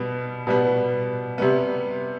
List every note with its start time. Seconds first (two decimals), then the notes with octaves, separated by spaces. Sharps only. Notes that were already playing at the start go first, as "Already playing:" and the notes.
Already playing: B2 G3 B3
0.47 B2 G3 B3
1.38 C3 G3 B3